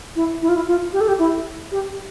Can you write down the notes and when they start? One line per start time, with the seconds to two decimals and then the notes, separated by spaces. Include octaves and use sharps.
0.16 E4
0.42 E4
0.49 F4
0.56 E4
0.67 F4
0.93 G4
1.01 A4
1.08 G4
1.19 E4
1.72 G4